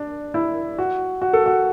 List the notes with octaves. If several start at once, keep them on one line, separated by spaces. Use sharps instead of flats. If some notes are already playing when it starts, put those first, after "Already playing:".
Already playing: D4
E4
F#4
F#4
A4
F#4